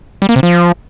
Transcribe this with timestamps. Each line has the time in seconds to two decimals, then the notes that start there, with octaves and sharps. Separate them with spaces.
0.22 G3
0.29 A#3
0.36 C3
0.43 F3